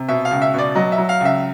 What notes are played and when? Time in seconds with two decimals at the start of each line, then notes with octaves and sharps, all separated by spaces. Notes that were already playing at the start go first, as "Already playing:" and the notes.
Already playing: C3
0.08 B2 E5
0.25 F5
0.31 C#2
0.42 E5
0.54 B2 D5
0.75 F#3 D#5
0.92 E5
0.98 F#3
1.09 F5
1.20 C#2 E5